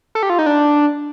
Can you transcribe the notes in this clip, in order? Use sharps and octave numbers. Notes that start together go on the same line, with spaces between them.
A4
G4
F4
D#4
D4